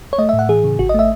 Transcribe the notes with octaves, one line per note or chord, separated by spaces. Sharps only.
C#5
A3 D#5
E5
A2
F#5
E3 G#4
C#3
G#1 F#4
D#5
A3 E5